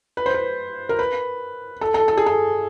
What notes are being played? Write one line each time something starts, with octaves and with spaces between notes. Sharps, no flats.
B4
C5
B4
A#4
B4
A4
A4
A4
G#4
A4